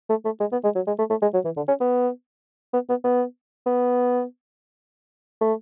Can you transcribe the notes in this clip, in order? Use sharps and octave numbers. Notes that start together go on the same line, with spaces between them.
A3
A3
G#3
B3
G#3
F#3
G#3
A3
A3
G#3
F#3
E3
D3
C#4
B3
B3
B3
B3
B3
A3